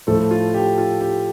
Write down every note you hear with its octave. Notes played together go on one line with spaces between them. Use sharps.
A2 F3 A3 A4
F4
G4
F4
G4